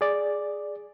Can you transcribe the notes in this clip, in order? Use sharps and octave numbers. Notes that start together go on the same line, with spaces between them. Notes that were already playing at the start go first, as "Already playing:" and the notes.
G#4 D5